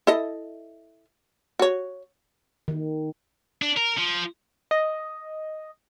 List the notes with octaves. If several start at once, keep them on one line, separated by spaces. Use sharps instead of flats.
E4 A4 D#5
F#4 C#5
D#3
D4
A#4
F3
D#5